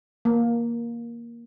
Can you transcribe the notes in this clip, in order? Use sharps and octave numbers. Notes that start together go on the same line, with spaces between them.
A#3